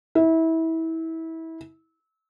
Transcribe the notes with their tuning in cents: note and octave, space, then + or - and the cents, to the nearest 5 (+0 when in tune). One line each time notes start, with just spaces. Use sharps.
E4 -25